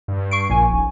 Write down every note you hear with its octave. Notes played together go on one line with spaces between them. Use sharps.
G2
C#6 C7 D7
A#1 A#2 G#5 C#6
D#1